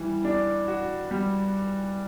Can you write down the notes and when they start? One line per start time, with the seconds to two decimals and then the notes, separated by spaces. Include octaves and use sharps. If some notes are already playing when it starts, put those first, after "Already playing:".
Already playing: E3 G3
0.25 D4
0.68 F#4
1.11 G3